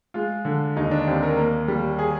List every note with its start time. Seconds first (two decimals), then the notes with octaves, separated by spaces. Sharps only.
0.14 G#3 F4
0.45 D3
0.76 D#2 D#4
0.91 D4
1.07 D#2 C4
1.23 A#4
1.37 A#3
1.68 G3
1.99 G#4